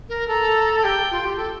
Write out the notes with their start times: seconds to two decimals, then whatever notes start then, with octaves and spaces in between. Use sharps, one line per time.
0.09 A#4
0.28 A4 A#5
0.83 G4 G5
1.11 F4
1.25 G4
1.37 A4